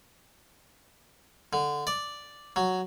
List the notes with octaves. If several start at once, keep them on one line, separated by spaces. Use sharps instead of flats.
D3
D5
F#3